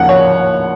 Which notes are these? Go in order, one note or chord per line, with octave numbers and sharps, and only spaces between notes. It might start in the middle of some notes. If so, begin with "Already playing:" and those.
Already playing: D#2 C#3 F3 A#3 F#5
C#5